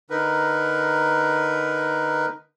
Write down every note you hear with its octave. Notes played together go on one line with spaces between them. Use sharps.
D3 D#4 A#4 B4